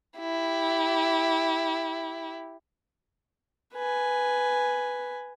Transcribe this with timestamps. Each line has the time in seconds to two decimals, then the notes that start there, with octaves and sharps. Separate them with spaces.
0.19 E4 G4
3.74 B4 G#5